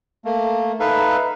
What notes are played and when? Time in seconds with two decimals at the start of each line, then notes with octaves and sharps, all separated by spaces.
0.25 A3 A#3
0.80 D#4 A4 B4 E5 F5